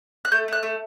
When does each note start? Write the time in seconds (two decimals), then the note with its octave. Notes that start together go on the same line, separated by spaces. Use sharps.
0.25 F#6
0.32 A3 G6
0.48 A3 F#6
0.63 A3